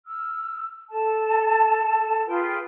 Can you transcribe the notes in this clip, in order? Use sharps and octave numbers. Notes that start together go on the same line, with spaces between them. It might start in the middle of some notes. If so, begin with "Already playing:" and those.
E6 F6
A4 A5
F4 G#4 B4 G5